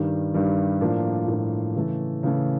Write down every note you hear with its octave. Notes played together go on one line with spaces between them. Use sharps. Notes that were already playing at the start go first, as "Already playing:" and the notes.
Already playing: G2 D#3 G3
G2 D#3 G3
A2 F3 A#3 D4
A2 F3 A#3 D4
C#3 E3 A3
C#3 E3 A3